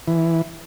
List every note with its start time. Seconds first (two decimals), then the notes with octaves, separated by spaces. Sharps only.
0.08 E3